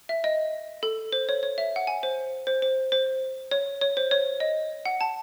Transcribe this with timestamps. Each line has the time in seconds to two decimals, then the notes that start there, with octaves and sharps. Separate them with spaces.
0.09 E5
0.24 D#5
0.83 A4
1.13 C5
1.29 C#5
1.43 C#5
1.58 E5
1.76 F#5
1.87 G#5
2.03 C5
2.47 C5
2.62 C5
2.92 C5
3.51 C#5
3.81 C#5
3.97 C5
4.11 C#5
4.40 D#5
4.85 F#5
5.01 A5